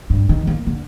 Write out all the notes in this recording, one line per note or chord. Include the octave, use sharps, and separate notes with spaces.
G2
D#3
A#3
D3